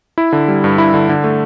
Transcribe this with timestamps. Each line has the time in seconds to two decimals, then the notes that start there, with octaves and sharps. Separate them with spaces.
0.18 E4
0.32 D3
0.48 G3
0.64 G2
0.78 E4
0.94 D3
1.09 D3
1.24 A3